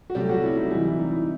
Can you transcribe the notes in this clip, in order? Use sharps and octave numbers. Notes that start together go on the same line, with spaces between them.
F#4
C3 F#3 G3 A3 G4
F#3 F#4
E4
D#4
C3 E3 G3 E4
E4
D#4
E4